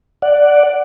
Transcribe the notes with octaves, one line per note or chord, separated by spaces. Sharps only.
D5 F#5